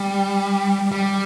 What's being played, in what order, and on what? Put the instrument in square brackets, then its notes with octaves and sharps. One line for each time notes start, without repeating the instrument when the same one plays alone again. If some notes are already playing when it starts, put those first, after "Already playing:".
Already playing: [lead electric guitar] G3
G3